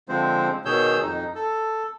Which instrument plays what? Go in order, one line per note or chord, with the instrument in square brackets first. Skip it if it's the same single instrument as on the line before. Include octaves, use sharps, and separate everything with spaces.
[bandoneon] D3 F3 G#3 C4 C5
B2 D#3 G#4 C#5 E6 G6
F2 D#4
A4